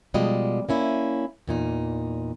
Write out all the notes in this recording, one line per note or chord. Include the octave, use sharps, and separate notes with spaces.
B2 F3 G3 G#3 D#5
A#3 C#4 E4
E2 A#2 D#4